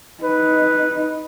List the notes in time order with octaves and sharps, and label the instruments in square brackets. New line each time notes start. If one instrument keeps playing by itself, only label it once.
[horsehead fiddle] D#4 [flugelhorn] B4